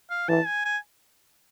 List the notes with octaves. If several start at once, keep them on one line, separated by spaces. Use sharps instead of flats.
F5
E3 A5
G#5
G#5